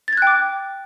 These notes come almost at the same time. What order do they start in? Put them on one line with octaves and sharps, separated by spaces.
A6 G#6 F#6 G5 D6